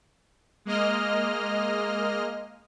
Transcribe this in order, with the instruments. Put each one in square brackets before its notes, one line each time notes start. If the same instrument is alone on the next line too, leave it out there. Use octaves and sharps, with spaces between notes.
[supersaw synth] G#3 A#3 D#5 F6